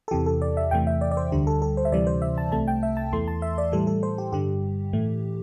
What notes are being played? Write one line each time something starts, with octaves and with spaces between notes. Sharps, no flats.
A4
E2 C3 E3 G4
A4
D5
E5
E2 C3 E3 A3 G5
E5
D5
D5
C5
D2 D3 G3 G4
A4
A4
C5
E5
D2 C3 E3 G3 D5
C5
E5
A5
C2 C3 A3 A5
G5
E5
A5
E2 E3 A3 C6
A5
E5
D5
A2 E3 G3 A4
A4
C5
G4
G2 D3 G3 G4
A2 E3 A3